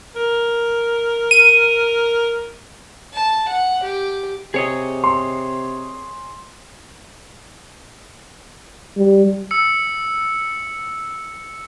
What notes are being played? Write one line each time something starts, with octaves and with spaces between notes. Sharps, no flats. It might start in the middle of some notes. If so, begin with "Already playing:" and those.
A#4
D#7
A5
F#5
G4
C3 G#4 C#5 D#5
C6
G3
E6 C#7